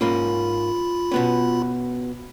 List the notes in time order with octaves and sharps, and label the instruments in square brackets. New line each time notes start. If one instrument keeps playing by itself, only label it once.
[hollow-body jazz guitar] G#2 A#3 C#4 [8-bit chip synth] F4 B5
[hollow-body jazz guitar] B2 B3 C#4